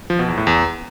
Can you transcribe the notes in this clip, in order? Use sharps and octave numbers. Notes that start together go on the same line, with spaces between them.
F3
B2
E2
A2
E2